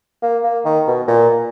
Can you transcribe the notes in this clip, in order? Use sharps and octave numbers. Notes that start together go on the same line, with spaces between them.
A#3
A#3
D#3
B2
A#2